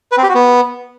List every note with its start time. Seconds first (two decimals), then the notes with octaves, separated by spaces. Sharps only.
0.12 B4
0.17 C4
0.23 G4
0.29 F#4
0.35 B3